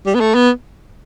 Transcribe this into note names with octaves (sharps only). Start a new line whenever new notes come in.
G3
B3
A3
B3